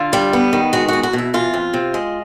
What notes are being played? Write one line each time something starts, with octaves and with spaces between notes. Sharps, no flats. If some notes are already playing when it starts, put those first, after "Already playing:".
Already playing: D3 F4
G3
B3
D#3
G#3 F#4
E2 F#4
F#4
B2 E4
E3 F4
F2
C3
G#3